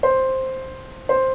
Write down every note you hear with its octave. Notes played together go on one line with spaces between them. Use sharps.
C5
C5